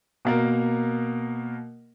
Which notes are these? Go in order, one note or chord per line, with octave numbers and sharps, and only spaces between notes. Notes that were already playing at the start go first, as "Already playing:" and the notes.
B2 A#3 A#4